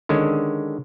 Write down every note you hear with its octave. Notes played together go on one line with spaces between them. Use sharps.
D3 D#3 G#3 C#4